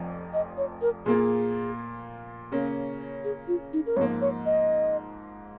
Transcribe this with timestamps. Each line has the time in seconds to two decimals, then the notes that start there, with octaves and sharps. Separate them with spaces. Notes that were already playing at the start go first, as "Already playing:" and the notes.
Already playing: F1 F2 F3
0.33 D#5
0.58 C#5
0.82 A#4
1.06 A#2 A#3 F4 G#4
2.52 C#3 A#3 C#4
3.24 G#4
3.48 F4
3.73 D#4
3.86 A#4
3.97 G#2 C#5
3.99 F3 A#3
4.21 C#5
4.46 D#5